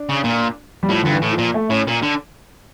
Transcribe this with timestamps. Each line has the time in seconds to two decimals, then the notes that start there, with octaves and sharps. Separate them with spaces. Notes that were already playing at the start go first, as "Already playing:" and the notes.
Already playing: D4
0.09 C#3
0.24 A#2
0.83 G3
0.89 A2 F3
1.03 G2 D3
1.11 E3
1.22 A2
1.32 F3
1.38 A#2
1.54 A3
1.70 A2 C#4
1.87 A#2
2.02 D3